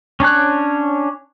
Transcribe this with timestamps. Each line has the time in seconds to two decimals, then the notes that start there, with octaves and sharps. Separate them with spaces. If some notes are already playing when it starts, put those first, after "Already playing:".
0.20 C#4 D4 C#5 F#6